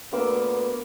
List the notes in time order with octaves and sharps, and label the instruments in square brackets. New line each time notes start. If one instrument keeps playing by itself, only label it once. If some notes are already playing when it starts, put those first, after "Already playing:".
[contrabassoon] D2 [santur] A#3 D6 E6 [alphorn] B3